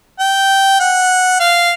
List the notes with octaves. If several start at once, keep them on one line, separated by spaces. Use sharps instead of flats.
G5
F#5
F5